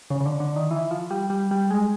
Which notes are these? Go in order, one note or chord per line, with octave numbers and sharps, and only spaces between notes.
C#3
C#3
D3
D3
D#3
E3
F3
G3
G3
G3
G#3